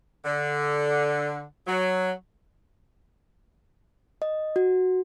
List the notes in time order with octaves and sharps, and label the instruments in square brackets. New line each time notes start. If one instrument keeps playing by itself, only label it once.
[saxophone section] D3
F#3
[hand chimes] D#5
F#4